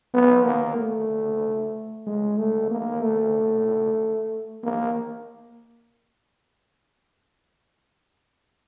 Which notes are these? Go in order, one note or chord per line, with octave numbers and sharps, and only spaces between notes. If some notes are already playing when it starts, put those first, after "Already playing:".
B3
A#3
A3
G#3
A3
A#3
A3
A#3